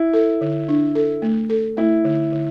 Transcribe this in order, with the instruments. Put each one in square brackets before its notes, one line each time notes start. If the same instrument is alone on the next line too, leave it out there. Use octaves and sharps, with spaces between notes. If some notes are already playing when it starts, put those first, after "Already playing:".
Already playing: [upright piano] E4
[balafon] A4
D3
D4
A4
A3
A4
[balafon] A3 [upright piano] E4
[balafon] D3
D3